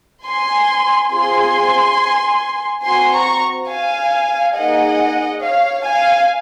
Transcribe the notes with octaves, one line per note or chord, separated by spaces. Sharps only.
G#5 C6
C4 F4 G#4 G#5 C6
C4 F#4 G#5 C6
A#5 C#6
F5 G#5
A#3 D#4 G#4 D#5 F#5
C#5 F5
F5 G#5